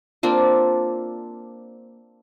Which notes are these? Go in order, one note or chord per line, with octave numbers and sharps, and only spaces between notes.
A#3 C4 D4 F4